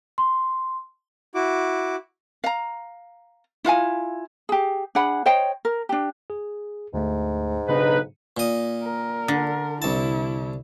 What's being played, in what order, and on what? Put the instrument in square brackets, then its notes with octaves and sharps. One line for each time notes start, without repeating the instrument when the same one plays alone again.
[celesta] C6
[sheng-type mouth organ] E4 F#4 D6
[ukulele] F5 A#5
E4 F4 F5 G#5
G4 G#4
D4 G#4 F#5 B5
C5 C#5 D#5 G5
A#4
D4 G4
[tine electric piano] G#4
[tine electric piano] D2 A3 [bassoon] G#2
[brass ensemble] B1 D#4 B4 [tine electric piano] C#3 B3 D4
[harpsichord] A#2 D#5
[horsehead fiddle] A#4
[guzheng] D3
[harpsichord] C2 A5 [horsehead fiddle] E4